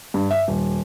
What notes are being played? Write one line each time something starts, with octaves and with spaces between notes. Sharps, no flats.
G2
E5
D#1